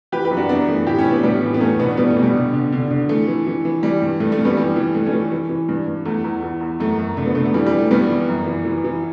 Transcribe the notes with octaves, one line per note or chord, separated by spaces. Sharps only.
E3 G4 B4
G4 B4
F#2
D4 F#4
F#2 B3 D4
E3 A3
A2 E4 G4
C#4 E4
A2
B3 D4
A2 G3 B3
E3
B3
E2 A3 C#4
B2 B3 D4
E2 G3 B3
A3
B2
G3
D3
D3
D3
D3
E3 A3
E3
E3
E3
E3 G3
G2
G2 A3
A3
G2
G3 B3
E3 G3
E3
G2 A3
A3 C#4
E3
E3
E3
G2
G2
E2 A3
E2
E2
E2
F#2 A3
F#2
D3 A3
B3
D3 A3
A3
E3 G3
G3
E3
A3
G2 G3 B3
E3
F#2
E3
E3
E3